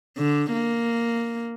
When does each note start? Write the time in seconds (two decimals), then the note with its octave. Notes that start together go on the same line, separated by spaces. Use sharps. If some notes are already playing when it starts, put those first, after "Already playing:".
0.18 D3
0.52 A#3